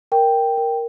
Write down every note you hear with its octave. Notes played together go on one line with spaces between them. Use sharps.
A#4 G5
A#4